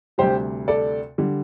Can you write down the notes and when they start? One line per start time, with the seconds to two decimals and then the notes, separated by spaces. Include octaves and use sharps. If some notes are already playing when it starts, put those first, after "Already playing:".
0.18 D2 C3 G3 G4 C5
0.68 A4 D5
1.18 D3 G3